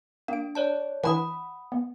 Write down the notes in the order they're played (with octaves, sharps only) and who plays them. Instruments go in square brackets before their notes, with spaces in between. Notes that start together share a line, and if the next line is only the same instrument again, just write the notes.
[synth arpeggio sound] A#3 D7 [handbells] D4
[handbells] C#5 D5 A5
[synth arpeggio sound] E3 D4 E4 [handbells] F#5 B5 D#6
[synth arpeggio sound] B3